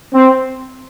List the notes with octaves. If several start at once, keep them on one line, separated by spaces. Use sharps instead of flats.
C4